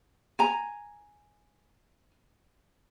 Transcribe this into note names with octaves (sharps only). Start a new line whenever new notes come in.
G#5 A#5